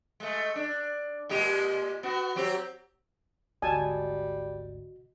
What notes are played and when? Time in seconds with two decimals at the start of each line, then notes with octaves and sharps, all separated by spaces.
0.20 G#3 A3
0.55 D4
1.29 A#2 G#3 G4
2.03 B3 F#4
2.36 F#3 C4 G4
3.62 G#1 D2 G3 F#4 D#5 G#5 A5